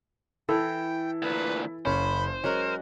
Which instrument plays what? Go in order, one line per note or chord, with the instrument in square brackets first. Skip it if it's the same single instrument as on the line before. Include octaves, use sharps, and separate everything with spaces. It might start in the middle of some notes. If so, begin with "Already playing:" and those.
[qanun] E3 [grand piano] E4 A4 [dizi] G5
[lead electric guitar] D2 A#2 [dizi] B4
[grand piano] F#1 C#4 [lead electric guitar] C5 [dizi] B5
[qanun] F#3 G#3 F#5 [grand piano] C#4 [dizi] A#4